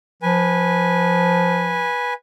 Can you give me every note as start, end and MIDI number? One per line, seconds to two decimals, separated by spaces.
0.22 1.91 53
0.22 2.14 71
0.22 2.14 80